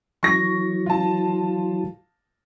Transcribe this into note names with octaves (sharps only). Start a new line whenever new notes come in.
E3 F#3 C#6 A#6
F4 A5